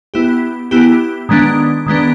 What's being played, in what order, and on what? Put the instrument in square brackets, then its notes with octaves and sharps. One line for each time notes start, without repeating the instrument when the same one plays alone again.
[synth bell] B3 E4 G4
B3 E4 G4
D#3 G#3 B3 D4
D#3 G#3 B3 D4